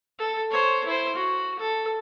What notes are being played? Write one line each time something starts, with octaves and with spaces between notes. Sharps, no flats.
A4
C5 C#5
E4 C5
F#4
A4